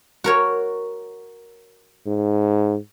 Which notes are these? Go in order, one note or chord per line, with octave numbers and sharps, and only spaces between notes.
F#4 A#4 C#5
G#2